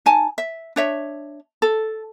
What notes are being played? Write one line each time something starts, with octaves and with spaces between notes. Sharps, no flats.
D#4 G#5 A5
E5
D4 C#5 E5
A4